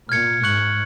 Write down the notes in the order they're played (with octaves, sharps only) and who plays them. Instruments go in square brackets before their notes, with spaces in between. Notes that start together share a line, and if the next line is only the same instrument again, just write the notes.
[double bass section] A#2 [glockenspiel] F6 G#6 C#7
[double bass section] G#2 [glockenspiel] C#6 F#6 C#7 F#7